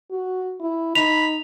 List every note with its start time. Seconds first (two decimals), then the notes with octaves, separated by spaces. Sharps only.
0.11 F#4
0.60 E4
0.95 D#4 B5 F7